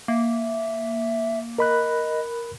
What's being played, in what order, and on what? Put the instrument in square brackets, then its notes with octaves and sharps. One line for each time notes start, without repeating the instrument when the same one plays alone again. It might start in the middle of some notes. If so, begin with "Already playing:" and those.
[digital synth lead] A#3 [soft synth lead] E5
[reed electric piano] A#4 B5 F#6 [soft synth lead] D#5